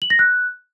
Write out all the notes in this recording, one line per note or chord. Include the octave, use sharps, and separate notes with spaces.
F#7
A#6
F#6